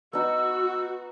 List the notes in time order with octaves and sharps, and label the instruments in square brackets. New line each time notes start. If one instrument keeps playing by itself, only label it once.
[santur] B3 D#4 [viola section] F#4 [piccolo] E6